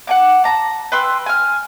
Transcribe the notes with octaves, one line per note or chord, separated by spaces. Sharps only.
F#5 G#5 D6
A5 A#5
B4 G5 C6 E6
G#5 F6